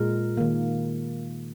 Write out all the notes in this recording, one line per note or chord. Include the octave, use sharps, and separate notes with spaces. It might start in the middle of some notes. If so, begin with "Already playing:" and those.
Already playing: A#2 G#3 A#4
D#3 A#3